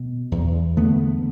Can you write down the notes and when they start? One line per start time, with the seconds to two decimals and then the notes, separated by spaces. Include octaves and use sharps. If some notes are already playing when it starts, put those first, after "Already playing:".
Already playing: B2
0.32 E2
0.77 D3 A3 B3